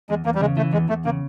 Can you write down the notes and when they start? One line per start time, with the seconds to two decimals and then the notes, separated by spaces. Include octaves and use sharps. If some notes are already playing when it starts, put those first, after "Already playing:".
0.10 E2 G#3
0.25 E2 A#3
0.35 G3
0.41 C#3 G#3
0.57 E3 A3
0.73 E2 G#3
0.89 E2 A3
1.05 C#3 A#3